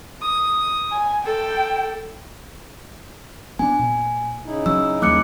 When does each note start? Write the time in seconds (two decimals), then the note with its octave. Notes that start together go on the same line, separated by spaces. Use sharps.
0.21 D#6
0.91 G#5
1.25 A4 G5
3.59 B3 D4 G#5
3.79 A#2
4.46 C#3 D#4 E4
4.66 F#3 C#4 E6
5.02 D#2 G3 A#3 D6 F#6 C#7